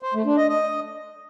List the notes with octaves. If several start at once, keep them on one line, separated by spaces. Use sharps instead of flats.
C5
A3
D4
D#5
D#5